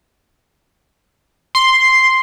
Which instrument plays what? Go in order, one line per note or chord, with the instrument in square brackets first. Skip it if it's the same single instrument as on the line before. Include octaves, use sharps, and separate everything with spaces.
[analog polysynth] C6